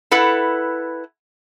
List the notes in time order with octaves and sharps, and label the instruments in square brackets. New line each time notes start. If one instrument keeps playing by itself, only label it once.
[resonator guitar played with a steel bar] E4 A4 B4 F#5